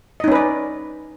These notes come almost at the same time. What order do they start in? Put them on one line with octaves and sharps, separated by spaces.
D#5 D#4 C#4 B4 D5